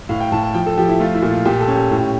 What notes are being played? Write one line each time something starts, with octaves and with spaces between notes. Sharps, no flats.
A2 F5
G5
A2 A5
A5
F3 G5
A4
F3 G4
E4
A3 F4
E4
A#2
F4
A#2 G4
A4
C#4
G4
A2